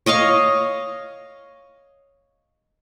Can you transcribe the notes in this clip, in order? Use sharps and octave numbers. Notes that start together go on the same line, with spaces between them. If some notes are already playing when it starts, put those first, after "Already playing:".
C#5 D#5 F5 C#6